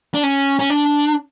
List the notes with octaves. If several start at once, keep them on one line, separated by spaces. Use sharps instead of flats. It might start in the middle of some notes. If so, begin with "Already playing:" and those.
D4
C#4
C#4
D4